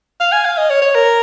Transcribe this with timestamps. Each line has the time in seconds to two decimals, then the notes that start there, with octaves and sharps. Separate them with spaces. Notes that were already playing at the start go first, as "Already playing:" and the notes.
0.20 F5
0.32 G#5
0.45 F5
0.57 D#5
0.70 C#5
0.82 C#5
0.95 A#4